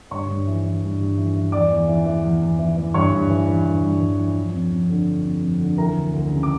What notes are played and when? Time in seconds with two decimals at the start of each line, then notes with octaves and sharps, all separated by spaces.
0.11 G2 C#5 C#6
0.28 G2
0.47 E3
0.64 E3
0.82 G2
1.00 G2
1.17 E3
1.35 E3
1.52 E2 D5 D6
1.71 E2
1.88 E3
2.06 E3
2.24 E2
2.42 E2
2.59 E3
2.77 E3
2.94 G2 C#5 C#6
3.12 G2
3.30 E3
3.47 E3
3.65 G2
3.83 G2
4.01 E3
4.19 E3
4.36 F3
4.54 F2
4.72 F2
4.89 D3
5.07 F3
5.25 F2
5.42 F2
5.60 D3
5.78 E3 A#4 A#5
5.96 D2
6.13 D2
6.31 C#3
6.43 D6